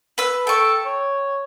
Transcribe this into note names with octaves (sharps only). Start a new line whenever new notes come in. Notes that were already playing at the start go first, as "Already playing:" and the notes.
B4 E6
A4 G5 C#6
C#5